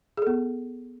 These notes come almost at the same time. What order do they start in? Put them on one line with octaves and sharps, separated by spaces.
G#4 A4 B3